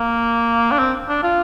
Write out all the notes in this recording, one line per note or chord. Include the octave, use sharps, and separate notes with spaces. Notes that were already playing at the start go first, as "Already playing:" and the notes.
Already playing: A#3
D4
C4
D4
F4